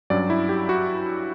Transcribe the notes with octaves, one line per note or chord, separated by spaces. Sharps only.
G2 F#3 C#4 D5
E4
G4
F#4